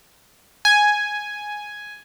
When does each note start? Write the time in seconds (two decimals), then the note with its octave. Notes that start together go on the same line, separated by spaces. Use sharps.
0.65 G#5